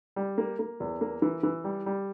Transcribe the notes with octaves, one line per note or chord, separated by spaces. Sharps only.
G3
A#3
A#3
E2
A#3
E3
E3
G3
G3